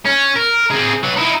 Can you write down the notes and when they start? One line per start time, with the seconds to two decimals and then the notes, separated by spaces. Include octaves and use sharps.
0.06 C#4
0.36 A#4
0.71 C4 G#4
1.03 F#3 B4
1.17 D#4 E4